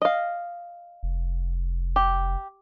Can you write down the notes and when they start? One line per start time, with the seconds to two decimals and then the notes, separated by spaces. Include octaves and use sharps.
0.02 D#5 F5
1.03 F1
1.96 G4